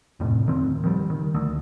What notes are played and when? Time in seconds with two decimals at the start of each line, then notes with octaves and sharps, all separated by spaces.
0.20 F2 A2 C3
0.46 D1 D#3 C4
0.84 D#3 F3 G3
1.10 D#3
1.35 D2